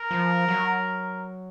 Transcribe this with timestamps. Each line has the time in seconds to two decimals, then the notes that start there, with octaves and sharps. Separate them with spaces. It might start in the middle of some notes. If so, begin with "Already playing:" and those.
Already playing: A#4
0.11 F3
0.48 F#3